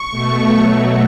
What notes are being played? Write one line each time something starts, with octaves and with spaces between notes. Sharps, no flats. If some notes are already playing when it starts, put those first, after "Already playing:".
Already playing: C#6
B2 A3
B2 F#3 A3